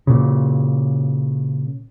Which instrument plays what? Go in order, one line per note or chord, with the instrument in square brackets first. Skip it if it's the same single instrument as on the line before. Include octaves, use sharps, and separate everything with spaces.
[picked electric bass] A#2 C#3